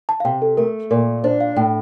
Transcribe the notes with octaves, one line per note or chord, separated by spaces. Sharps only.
A5
F5
C3 G5
A4
A3 A#4
A#2 A#4
D4 C5
F5
A2 G5